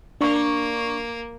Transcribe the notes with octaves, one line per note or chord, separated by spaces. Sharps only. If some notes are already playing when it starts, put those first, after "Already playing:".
A#3 D4 C#6